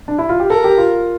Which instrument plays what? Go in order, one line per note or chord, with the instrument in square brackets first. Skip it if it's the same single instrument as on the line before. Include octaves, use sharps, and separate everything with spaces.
[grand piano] D4
E4
F4
G4
[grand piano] A4 [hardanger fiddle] A#4
[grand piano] G4
F4